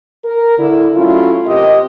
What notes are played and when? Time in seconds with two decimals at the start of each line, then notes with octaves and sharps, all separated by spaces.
0.25 A#4
0.58 D3 E4
0.95 F#3 A3 C#4 E4 F4
1.46 C3 G4 A#4 D#5